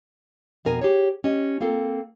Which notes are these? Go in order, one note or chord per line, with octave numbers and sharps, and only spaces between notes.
F2 B2 A#4 G#5
G4 G#4 C#5
C#4 G4 D#5
A#3 C4 F4 A4 A#4